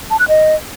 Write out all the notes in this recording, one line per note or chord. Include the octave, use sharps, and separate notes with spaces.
A5
F#6
D#5